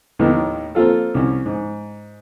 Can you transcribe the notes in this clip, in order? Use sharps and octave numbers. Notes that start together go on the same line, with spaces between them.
D#2 A2 D#3 B3
A#3 C4 F4 A4
C2 C#4
G#2